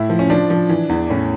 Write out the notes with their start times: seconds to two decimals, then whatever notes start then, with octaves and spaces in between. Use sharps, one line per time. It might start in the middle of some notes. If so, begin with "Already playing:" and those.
Already playing: A2 E4
0.10 F3
0.19 C#4
0.30 F3 D4
0.50 F3
0.69 E3
0.89 E2
1.10 A2 C#4